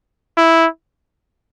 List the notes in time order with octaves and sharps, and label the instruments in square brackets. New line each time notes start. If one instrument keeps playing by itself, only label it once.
[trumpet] E4